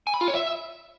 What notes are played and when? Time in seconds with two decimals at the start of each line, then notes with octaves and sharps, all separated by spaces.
0.07 G#5
0.14 B5
0.21 F4
0.28 C#5
0.35 E5